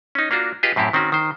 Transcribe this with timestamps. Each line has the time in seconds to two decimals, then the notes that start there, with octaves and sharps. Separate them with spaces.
0.15 C#4 D#4
0.31 A#3 D4 F4 F#4
0.63 F4 G4 G#4 B4 D#5
0.76 F#2 A2 C4 E4 G4
0.93 D#3 C4 C#4 F#4
1.12 D#3 C5